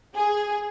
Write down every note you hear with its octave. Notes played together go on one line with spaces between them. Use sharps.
G#4